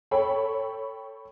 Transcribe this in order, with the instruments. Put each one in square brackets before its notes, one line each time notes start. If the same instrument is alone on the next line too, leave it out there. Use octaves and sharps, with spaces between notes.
[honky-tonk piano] A4 C#5 G5 B5